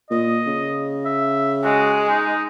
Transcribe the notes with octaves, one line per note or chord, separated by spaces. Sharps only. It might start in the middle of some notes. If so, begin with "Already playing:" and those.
A#2 D#5
C#3
E5
G#3 F#4
D#4